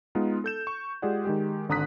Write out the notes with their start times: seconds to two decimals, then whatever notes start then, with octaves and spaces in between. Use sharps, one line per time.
0.15 G#3 B3 D#4 F4
0.44 A4 G6 E7
0.67 C#6
1.02 G#3 F4 G4 G#4 D5 F#5
1.25 D#3 G#3 G4
1.69 G#1 D3 A#5 D#6 F#6 B6